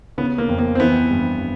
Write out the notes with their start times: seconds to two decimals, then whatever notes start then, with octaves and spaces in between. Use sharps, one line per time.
0.18 C#3 B3
0.38 A#3
0.49 F2
0.59 A#3
0.75 C4
0.79 E3 B3
1.11 G2